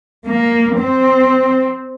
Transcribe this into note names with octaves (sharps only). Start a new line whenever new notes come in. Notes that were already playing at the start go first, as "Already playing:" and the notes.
A#3
C4